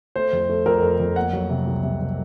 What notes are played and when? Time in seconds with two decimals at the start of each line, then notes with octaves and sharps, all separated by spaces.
0.16 A3 C5
0.33 F2
0.49 A3
0.66 F2 A#4
0.82 F2
0.99 F2
1.16 A#3 F#5
1.33 F#3
1.50 C3
1.67 C2
1.83 C3
2.00 C3